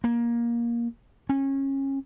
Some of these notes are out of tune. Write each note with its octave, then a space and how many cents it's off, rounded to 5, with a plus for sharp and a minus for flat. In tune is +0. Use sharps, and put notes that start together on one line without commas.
A#3 +15
C#4 -25